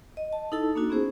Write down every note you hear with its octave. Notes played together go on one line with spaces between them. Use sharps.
D#5
A5
D#4 E4 A4 A5 E6
A#3 D4 D#4 F#4
B3 C#4 E4 G#4 C5